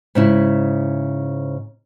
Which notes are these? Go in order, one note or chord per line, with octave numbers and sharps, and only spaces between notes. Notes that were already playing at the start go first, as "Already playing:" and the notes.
G#2 C#3 E4